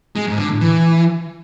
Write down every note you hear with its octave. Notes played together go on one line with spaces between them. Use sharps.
G#3
G#2
D3
A2
E3